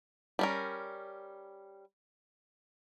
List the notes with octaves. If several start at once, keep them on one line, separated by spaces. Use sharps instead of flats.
G3 C#4 A#4